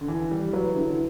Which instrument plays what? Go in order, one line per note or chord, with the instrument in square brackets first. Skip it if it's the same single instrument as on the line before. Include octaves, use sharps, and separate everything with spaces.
[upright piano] D3
[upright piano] E3 [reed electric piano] E4
[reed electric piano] E3 [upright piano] G3
[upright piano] F#3 [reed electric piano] B4
[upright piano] D3 [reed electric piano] E4